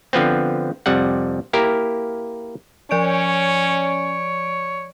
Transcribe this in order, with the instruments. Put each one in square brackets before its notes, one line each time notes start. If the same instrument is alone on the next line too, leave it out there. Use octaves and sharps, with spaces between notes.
[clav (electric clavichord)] D3 F3 B3 C4
F2 C3 G3 F#5
A#3 E4 G4 A#4
[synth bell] F3 D5 D7 [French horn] C#4 [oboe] C#5